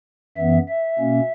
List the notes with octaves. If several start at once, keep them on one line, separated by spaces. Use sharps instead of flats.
F#2 E3 B3 E5
E5
B2 A#3 C#4